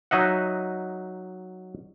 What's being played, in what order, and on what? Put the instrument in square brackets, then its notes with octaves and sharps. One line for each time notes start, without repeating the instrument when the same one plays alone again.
[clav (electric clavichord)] F#3 D#4 D#5 E5 F#5